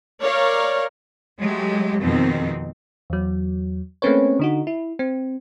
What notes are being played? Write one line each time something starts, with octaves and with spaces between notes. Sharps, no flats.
A#4 C#5 D5 F5
F#3 G#3 A3 G4
F2 B2 D#3 G#3 C4 D#4
E2 F#3
A3 A#3 C4 C#4 B4 C#5
D3 D#4 F#4
E4
C4